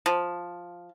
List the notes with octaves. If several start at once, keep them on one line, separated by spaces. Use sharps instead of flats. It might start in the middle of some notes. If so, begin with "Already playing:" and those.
F3